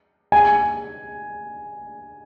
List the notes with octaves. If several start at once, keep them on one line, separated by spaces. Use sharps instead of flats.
G#5